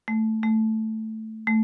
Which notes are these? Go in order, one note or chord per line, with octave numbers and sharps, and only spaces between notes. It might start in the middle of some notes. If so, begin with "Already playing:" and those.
A3
A3
A3